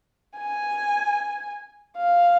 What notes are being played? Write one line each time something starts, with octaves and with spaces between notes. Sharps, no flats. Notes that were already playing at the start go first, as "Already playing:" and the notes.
G#5
F5